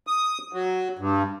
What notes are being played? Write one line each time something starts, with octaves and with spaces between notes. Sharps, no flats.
D#6
F#3
G2